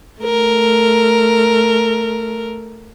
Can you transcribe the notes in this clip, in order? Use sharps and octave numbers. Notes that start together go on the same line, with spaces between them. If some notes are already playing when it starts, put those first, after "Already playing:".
A3 A#4